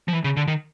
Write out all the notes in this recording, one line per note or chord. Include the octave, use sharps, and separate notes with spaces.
F3
E3
C#3
D3
D#3